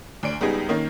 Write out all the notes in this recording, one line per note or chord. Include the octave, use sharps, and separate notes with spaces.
D2 D5 D7
C#2 G3 B3 D#4 G#4
D#3 A#3 C#4 D#4